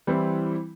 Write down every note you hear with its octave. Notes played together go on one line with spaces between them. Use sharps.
E3 G3 C4 E4